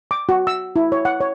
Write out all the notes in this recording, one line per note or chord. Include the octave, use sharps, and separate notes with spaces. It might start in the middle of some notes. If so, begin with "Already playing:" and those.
D6
F#4
E6
E4
C#5
F#5
C#5